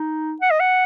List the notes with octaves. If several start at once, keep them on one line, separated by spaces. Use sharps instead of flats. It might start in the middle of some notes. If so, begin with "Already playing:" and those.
Already playing: D#4
F#5
D#5
F#5